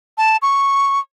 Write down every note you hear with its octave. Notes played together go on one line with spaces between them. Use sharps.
A5
C#6